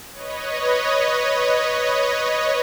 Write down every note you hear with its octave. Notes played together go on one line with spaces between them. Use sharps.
B4 C#5 D#5